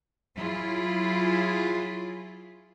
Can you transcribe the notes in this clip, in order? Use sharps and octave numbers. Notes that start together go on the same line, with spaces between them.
F#3 E4 F4 G#4